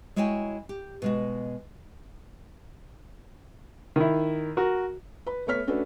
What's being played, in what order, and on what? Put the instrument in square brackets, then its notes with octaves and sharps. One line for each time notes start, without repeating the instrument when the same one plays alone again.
[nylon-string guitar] G#3 E4 F#4 C#5 G5 G#5
G4
B2 G#3 F#4
[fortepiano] D#3 E4
F#4 A#4
[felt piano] B4 B5
A3 B3 C#5 F6 B6
A3 C#4 D4 F#4 A4 B4